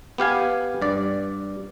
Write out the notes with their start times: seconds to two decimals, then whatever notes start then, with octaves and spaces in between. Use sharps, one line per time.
0.18 B3 G4 F5 G#5
0.82 G2 D5